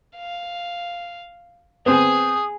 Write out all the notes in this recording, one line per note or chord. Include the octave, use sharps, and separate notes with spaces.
F5
B3 C4 G#4 D#6